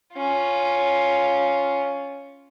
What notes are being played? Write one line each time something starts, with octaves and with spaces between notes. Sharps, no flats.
C#4 F4